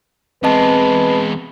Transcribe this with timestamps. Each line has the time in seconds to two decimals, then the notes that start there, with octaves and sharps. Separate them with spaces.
0.43 E2 G#3 C4 B4 D#5 A5